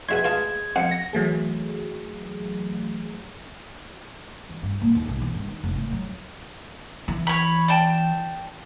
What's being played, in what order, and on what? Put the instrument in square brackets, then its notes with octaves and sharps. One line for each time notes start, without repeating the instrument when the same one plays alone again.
[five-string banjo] F4 F#4 G#4 [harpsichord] B4 E5 C6 [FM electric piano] G#6
[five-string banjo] G#3 B4 [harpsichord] F4 A5
[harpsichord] F2 C5 [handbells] F#5 C#7
[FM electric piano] A#6
E3 F#3 A3 G#4
[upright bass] E3
G2
A#2
D#2
B1
E3
G2
D#3
F1
A2
F#3
E3
[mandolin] C#5 B5
D5 G5 A5